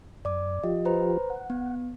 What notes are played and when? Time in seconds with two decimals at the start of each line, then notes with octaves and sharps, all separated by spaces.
0.25 F#2 D5 D6
0.64 F3 F4 G4 D#5
0.85 B4 C5 A#5
1.30 F#5
1.50 B3